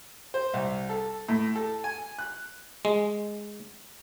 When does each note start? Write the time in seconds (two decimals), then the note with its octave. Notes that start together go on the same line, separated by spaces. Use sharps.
0.34 C5
0.54 C2
0.89 A4
1.29 A2
1.56 A4
1.84 G#5
2.19 F#6
2.85 G#3